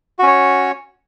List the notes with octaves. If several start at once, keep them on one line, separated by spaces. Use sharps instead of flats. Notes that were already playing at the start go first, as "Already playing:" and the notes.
C#4 F#4 C#5